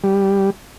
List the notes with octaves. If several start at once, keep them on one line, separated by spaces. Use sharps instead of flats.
G3